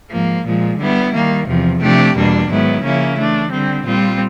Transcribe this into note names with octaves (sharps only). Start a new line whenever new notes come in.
G#2 F3 A#3
A#2 F3 G#3
D3 G3 B3 E4
D#3 G3 A#3
E2 C3 F3
C3 F3 A3 D4 G4
E2 B2 G3 A#3 D4
G#2 D#3 F#3 B3 E4
C#3 F3 A#3 C#4 E4
E3 A3 D4
D3 G3 C4
A#2 G3 C4 F4